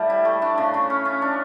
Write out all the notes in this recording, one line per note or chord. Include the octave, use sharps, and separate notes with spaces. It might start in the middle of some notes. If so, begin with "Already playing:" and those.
Already playing: A2 G3
E4
A3
D4
C#3
C#3
C#4
C#4
D4